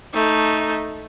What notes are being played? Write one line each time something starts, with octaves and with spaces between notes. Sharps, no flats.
A3 D#4